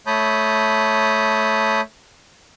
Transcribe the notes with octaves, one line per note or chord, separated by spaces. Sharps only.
A3 C#5 A5 B5 D#6 G6